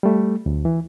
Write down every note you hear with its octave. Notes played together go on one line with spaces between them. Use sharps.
G3 A3
D2
E3